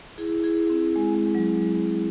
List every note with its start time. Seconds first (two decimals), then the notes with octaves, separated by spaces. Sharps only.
0.18 E4 G#4
0.44 E4 G#4
0.70 C4
0.96 G#3
1.15 G#3
1.35 F#3